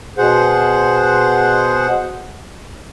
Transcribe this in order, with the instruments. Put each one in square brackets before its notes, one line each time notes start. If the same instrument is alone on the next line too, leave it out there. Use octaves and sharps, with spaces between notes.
[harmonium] B2 G#4 C5 F#5